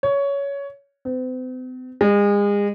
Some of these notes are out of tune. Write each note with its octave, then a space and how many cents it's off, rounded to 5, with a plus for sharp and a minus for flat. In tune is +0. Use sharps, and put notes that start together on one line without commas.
C#5 +15
C4 -45
G#3 -35